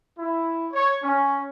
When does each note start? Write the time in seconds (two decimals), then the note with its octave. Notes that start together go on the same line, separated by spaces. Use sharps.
0.17 E4
0.72 C#5
1.03 C#4